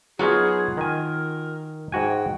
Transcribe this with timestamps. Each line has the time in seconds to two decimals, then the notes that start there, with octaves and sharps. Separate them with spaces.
0.19 F#3 B3 D#4 F4 F#4 G#4
0.77 D#3 A#4 G#5
1.92 G#2 F#4 G5 G#5